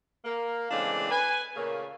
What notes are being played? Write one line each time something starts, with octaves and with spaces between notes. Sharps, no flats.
A#3
C#3 E3 G#3 A3 C4 D4
B4 G#5
A#2 C#3 A3 A#3